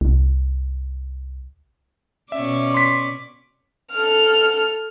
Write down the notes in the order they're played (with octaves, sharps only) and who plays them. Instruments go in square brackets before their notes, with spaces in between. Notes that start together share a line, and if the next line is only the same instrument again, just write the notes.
[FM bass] C2
[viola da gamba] B2 C#4 D5 [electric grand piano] E5
[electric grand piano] C6 B6
[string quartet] A4 F6